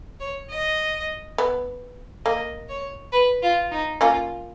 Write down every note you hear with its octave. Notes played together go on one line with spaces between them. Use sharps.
C#5
D#5
B3
A#3 D#5
C#5
B4
F4
D#4
A#3 C#4 F4